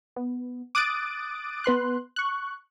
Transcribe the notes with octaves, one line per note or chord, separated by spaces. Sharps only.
B3
D6 D#6 F#6 A6 D7
B3 B4 C6 F#6
C#6 F#6